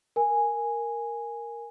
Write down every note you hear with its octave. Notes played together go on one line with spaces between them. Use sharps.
A#4 G#5